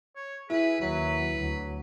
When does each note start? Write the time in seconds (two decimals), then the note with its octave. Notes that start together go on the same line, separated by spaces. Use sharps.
0.16 C#5
0.50 E4 G#4 B4
0.81 D#2 F#3 B4
1.36 D2 F#3